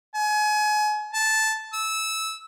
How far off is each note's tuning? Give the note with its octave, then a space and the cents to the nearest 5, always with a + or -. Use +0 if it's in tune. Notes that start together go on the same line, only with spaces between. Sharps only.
G#5 +30
A5 -5
E6 -15